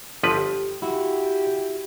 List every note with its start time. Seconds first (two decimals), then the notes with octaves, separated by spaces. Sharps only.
0.23 G1 F3 G4 B4
0.82 E4 F#4 G4